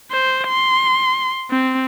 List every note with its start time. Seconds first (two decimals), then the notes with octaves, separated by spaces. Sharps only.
0.11 C5
0.48 C6
1.51 C4